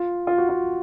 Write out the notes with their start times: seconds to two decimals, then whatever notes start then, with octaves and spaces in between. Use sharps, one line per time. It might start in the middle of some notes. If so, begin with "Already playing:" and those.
Already playing: F4
0.27 F4
0.38 F#4
0.49 F4